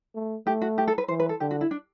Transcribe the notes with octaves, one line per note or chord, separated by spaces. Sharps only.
A3
A3 G4
F#4
G4
A4
B4
E3 C5
B4
A4
D3 G4
F#4
E4
D4